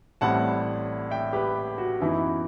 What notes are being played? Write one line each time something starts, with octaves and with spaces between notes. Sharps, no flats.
A1 A2 G3 C4 E4 F#5 A5
E5 G5
G4 B4
F#4
F#2 E3 B3 D#4 E4